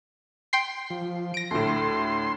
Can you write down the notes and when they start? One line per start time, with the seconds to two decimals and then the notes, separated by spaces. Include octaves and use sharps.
0.53 G5 C6 C7
0.90 F3
1.34 A#6 D7
1.51 D2 A2 C6